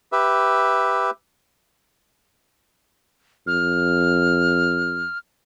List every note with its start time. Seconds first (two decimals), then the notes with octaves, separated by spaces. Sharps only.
0.12 G4 B4 E5
3.47 F2 F6